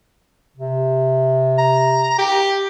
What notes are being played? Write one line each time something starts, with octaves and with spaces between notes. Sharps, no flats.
C3
A#5
G4